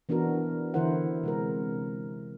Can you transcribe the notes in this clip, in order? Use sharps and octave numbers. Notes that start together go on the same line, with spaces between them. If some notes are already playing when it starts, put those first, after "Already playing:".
E3 B3 D4 F#4 A#4
D3 E3 E4 A#4 C5 F#5
C3 G#3 A#4